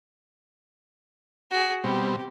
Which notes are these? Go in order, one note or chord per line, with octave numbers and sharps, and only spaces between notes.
F#4 G#4
B2 G3 C4 G4